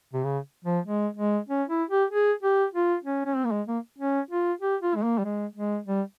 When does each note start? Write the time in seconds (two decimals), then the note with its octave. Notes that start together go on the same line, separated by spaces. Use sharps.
0.13 C3
0.24 C#3
0.65 F3
0.86 G#3
1.16 G#3
1.49 C#4
1.69 E4
1.90 G4
2.10 G#4
2.43 G4
2.74 F4
3.04 C#4
3.26 C#4
3.36 C4
3.45 A#3
3.51 G#3
3.68 A#3
3.98 C#4
4.30 F4
4.61 G4
4.82 F4
4.95 G#3
5.03 A#3
5.18 G3
5.24 G#3
5.56 G#3
5.87 G3